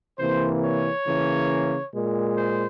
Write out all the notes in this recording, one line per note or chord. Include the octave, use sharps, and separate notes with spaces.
C3 E3 A#3 C5
C#5
C#3 E3 A#3
A#2 G#3
C5